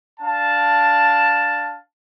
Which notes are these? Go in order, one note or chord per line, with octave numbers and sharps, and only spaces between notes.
D4 F5 A5